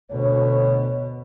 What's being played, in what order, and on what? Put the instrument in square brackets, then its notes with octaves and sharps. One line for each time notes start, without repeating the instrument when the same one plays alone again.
[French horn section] D2 C#5 [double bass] B2